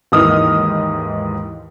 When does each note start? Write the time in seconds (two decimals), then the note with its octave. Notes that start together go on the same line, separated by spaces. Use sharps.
0.12 D#2 G#2 E3 D#4 D#6 F6